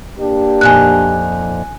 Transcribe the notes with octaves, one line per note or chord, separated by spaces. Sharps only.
A#3 D4 G4
F2 A#2 D#4 G#5 F#6